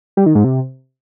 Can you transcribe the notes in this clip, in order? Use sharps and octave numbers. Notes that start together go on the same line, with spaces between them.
G3
D#3
G#2
C3